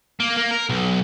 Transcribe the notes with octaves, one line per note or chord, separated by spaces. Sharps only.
A#3
A#3
A#4
B1